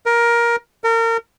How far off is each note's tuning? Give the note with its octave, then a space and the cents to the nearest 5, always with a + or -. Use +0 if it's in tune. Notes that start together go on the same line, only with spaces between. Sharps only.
A#4 +15
A#4 -30